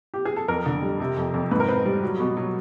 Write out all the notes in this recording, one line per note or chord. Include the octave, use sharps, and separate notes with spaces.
G4
G#4
A4
F2 A#4
D3
G3
C3
F2
F2
G#2 B4
A#4
C4 B4
G3
F#3
B2
F#3